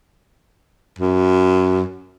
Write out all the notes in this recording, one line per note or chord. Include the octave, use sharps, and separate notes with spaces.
F#2